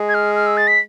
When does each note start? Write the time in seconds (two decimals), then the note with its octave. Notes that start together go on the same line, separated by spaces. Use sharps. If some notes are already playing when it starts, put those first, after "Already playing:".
Already playing: G#3
0.09 G#6
0.14 F6
0.35 F6
0.47 E6
0.57 A6
0.68 B6